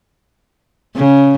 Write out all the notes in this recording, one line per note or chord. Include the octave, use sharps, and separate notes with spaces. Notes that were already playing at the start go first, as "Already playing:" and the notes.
C#3